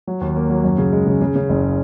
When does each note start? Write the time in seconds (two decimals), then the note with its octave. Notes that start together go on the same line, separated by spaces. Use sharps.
0.07 F#3
0.21 D#2
0.36 A#3
0.50 F#3
0.64 F#2
0.78 C#3
0.92 G#3
1.06 C#3
1.21 C#3
1.35 C#3
1.49 F#1